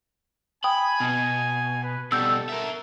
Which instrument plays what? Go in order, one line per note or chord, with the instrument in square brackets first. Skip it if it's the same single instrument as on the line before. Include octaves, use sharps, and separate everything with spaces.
[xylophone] G5 D#6 [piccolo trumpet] G#5 [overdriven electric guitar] B5
[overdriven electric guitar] B2
[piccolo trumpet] B4
[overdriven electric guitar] B2 G3 [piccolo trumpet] A4 [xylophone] E6 G6
[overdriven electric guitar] A#4 E5